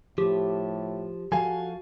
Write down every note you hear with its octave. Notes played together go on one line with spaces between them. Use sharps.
A2 F3 G4
F3 F#4 A4 F5 G#5